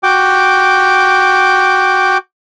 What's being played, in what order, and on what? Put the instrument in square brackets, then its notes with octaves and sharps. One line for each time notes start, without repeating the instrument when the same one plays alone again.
[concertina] F#4 G5 D6